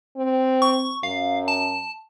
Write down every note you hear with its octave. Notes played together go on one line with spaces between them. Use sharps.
C4
C#6
F#2 F5
A5